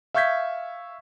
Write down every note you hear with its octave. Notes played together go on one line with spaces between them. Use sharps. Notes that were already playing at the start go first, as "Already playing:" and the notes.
E5 F5 C#6 G6 G#6 B6